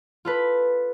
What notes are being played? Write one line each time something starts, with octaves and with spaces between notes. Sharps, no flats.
F4 A4 B4